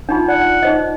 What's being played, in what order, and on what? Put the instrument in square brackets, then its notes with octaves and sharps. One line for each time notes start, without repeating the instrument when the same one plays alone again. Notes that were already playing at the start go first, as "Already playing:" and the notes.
[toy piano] D4 D#4 F4
[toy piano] D5 [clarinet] F#5
[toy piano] D#4 C5 D#5